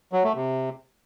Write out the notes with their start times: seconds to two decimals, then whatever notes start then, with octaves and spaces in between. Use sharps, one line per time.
0.13 F#3
0.24 A3
0.35 C3